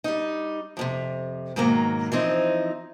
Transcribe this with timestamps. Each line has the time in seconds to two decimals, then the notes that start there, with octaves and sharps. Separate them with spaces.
0.04 G3 D#4
0.77 F2 A2 C3
1.56 G#2 B2 D#3 F#3 A#3
2.12 E3 F3 C4 D#4